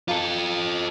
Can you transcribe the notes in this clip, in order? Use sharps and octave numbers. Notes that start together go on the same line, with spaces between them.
F4 A4